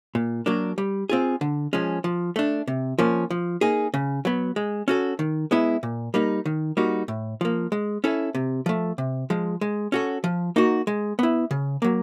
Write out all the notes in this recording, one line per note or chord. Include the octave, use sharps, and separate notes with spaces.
A#2
F#3 A#3 D4
G3
C4 F4 G#4
D3
F3 G#3 C#4
F3
A3 D4
C3
F3 A#3 C#4
F3
A#3 D#4 G#4
C#3
F#3 B3
G#3
C#4 F#4 A4
D#3
G#3 B3 E4
A#2
G3 A#3 D#4
D#3
G3 A#3 D#4 F#4
A2
F3 A#3
G#3
C#4 E4 A4
C3
F3 A3
C3
F3 G#3
G#3
C#4 F#4 A4
F3
A#3 D#4 F#4
G#3
B3 E4
C#3
F#3 A#3